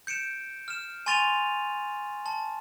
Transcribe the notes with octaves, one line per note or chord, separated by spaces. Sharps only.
G6 C#7 D7 E7
F6 E7
G#5 C6 C#6 A6 D#7 F7
A5